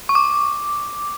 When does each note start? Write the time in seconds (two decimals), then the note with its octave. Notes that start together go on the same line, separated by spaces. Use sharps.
0.09 C#6
0.15 D6